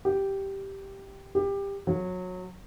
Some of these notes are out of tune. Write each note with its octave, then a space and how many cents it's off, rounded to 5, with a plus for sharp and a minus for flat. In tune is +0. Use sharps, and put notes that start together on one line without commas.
G4 -5
G4 +20
F#3 -20